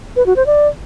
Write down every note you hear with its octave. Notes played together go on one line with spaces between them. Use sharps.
B4
F#4
C5
D5